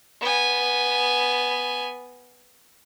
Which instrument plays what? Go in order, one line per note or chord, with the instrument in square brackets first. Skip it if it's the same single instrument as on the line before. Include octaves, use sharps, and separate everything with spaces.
[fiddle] B3 G#5